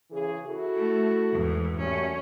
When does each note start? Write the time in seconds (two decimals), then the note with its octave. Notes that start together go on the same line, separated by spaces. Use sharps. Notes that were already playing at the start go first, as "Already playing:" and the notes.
0.11 C#3 E3 G#4
0.46 E4 F#4 A4
0.77 A3
1.32 E2 G#2
1.79 F#2 G3 A3 C#4